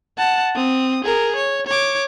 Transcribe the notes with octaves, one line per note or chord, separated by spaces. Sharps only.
F#5 A5
C4 D#6
G#4 A#4
C#5
C#5 D6